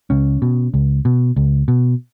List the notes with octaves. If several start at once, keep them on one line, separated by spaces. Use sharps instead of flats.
C#2 C#4
B2
C#2
B2
C#2
B2